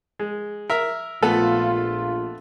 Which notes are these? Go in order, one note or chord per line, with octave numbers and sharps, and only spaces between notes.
G#3
A#4 E5
A#1 A3 B3 F4 A4